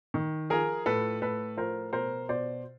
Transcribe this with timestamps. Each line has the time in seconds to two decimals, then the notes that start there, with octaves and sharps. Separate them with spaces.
0.14 D#3
0.50 F3 G#4 A#4
0.86 A2 A4 B4
1.22 A2 A4 B4
1.57 F3 A#4 C5
1.93 B2 A#4 C5
2.29 B2 C5 D5